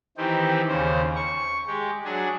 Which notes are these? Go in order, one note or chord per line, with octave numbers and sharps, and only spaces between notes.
D#3 E3 C4 D#4 G4
D#2 C#3 C5
C#6
G#3 G4
F#3 D4 G#4